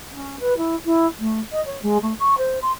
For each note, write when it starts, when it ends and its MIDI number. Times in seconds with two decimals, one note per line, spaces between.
0.12 0.37 61
0.39 0.53 71
0.57 0.74 64
0.85 1.06 64
1.19 1.39 57
1.51 1.63 75
1.65 1.81 73
1.82 1.97 56
2.02 2.13 57
2.19 2.37 85
2.37 2.58 72
2.62 2.71 84